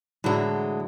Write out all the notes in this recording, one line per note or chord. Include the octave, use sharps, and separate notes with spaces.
A2 D3 E3 F#3 G#3